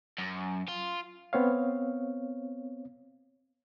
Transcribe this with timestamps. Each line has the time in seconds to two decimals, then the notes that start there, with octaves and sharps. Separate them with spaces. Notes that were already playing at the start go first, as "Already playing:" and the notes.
0.18 F#2
0.69 F4
1.33 B3 C4 C#5 F5